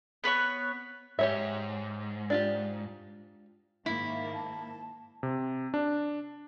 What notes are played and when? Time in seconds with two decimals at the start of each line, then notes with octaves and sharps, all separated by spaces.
0.24 B3 B4 C#5 C#6
1.19 G#2 G4 C#5 E5
2.30 D4 F4 G4
3.86 G#2 D#3 A#3 E4
4.35 A5
5.23 C3
5.74 D4